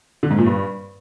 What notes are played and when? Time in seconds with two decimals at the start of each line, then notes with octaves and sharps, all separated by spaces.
0.23 D3
0.31 G#2
0.38 A#2
0.46 G2